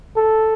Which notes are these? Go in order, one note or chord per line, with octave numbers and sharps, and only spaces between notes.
A4